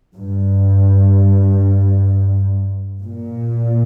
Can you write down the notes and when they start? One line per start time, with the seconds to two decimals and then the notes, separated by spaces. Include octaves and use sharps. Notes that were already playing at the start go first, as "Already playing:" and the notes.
0.17 G2
3.03 A#2